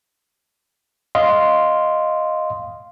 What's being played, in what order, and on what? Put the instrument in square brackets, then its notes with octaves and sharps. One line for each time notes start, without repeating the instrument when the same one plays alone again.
[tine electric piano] D#5 F5 C6